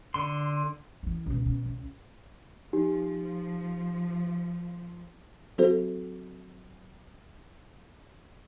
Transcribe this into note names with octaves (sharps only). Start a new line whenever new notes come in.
D3 C6
D#3 E3
C#2 B2
B2
C#2
F3 D#4 G4
F#3 C4 F#4 A4 C5